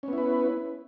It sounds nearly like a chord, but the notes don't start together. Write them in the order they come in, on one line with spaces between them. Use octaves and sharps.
C#4 B3 E4 B4